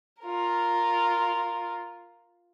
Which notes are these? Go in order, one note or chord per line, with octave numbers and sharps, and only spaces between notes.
F4 A#4